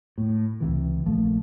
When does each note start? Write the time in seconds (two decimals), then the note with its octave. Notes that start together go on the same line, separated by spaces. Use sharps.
0.18 A2
0.60 C#2 C3 E3
1.06 A#1 F3 A3